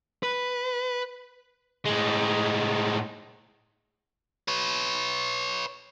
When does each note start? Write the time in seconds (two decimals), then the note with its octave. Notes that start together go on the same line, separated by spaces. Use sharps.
0.23 B4
1.86 A2 G#3
4.48 B4 C#5